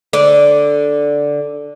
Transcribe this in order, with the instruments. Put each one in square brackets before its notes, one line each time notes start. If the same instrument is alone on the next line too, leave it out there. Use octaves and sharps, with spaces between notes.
[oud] D3 D5